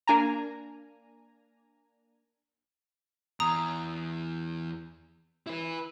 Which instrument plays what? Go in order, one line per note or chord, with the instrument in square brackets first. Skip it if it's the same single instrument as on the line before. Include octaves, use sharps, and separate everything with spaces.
[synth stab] A#3 D4 G#5 A#5
[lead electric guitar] E2 [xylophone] A#5 D#6
[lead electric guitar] E4 B4